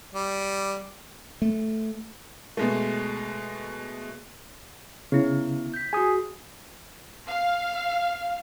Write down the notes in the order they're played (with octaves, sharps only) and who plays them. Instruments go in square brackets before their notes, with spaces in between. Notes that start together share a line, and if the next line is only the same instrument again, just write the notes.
[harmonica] G3
[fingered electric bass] A3
[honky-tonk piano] B2 G#3 A3
[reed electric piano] C#3 [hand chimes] B3 E4
[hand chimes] G6 B6
[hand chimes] F#4 G#4 [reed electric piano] G#5 D#6
[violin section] F5